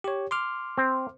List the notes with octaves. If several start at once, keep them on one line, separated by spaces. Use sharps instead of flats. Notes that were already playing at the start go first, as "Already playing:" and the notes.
G4 C#5
C6 D6 F6
C4